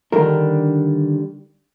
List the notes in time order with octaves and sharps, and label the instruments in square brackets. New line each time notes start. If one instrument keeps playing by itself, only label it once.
[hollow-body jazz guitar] D3 D#3 G3 D4 A#4